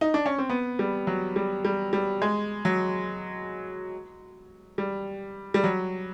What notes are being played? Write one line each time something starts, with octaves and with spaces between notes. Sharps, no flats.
D#4
D4
C#4
C4
B3
G3
F#3
G3
G3
G3
G#3
F#3
G3
G3
F#3